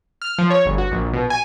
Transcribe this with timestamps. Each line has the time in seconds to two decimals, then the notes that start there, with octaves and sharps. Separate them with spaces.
0.22 F6
0.39 F3
0.50 C#5
0.66 G1
0.78 F#4
0.92 A#1
1.13 B2
1.30 G#5